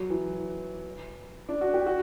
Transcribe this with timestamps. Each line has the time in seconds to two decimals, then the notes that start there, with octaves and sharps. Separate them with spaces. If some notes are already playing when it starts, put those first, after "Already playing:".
Already playing: F#3
0.10 E3
1.49 D4
1.61 F#4
1.74 G4
1.86 F#4